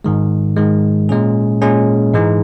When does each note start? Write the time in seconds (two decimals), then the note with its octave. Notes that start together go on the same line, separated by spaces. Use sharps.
0.04 G#2 D#3 G#3
0.57 G#2 D#3 G#3
1.09 A#2 G#3 C#4 G#4
1.62 A#2 G#3 C#4 G#4
2.14 G#2 E3 G#3 D#4